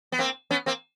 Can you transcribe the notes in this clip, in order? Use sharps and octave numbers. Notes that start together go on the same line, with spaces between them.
B3
A#3 C4
B3 C#4
A#3 C4